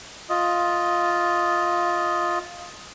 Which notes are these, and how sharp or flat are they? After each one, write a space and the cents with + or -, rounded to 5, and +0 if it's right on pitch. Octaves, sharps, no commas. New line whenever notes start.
F4 +5 D#5 +10